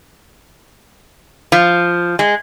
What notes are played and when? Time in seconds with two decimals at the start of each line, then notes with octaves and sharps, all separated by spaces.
1.52 F3
2.19 G#3